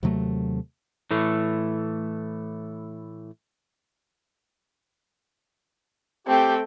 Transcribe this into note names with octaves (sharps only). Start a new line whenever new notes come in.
D#2 C3 F#3 A3
A2 E3 A3
A3 C4 G4 G5